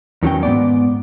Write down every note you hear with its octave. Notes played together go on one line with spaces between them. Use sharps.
E2 D#3 F#3 C#4 G5
G#2 B3 D5